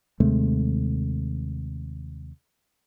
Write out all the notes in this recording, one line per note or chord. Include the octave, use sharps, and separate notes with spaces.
D#2 C3 G#3 A3